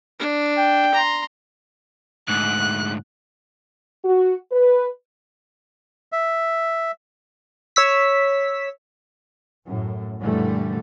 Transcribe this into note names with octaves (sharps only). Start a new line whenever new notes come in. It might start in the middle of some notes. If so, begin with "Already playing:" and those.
D4
G5
A#5 C6
D2 G#2 F#6
F#4
B4
E5
C#5 E6 B6
F#2 A2
F#2 A#2 D3 E3 G3 A3